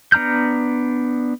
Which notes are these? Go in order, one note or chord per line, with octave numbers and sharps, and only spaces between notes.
B3 D4 A#5 F6 G6